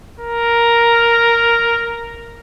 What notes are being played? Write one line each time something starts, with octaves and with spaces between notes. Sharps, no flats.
A#4